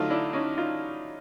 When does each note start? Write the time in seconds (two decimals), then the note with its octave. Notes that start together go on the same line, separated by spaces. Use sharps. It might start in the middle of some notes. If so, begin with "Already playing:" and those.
Already playing: D3 F#3 A3 D#4 F4
0.10 D4 E4
0.33 C#4 D#4
0.57 D#4 F4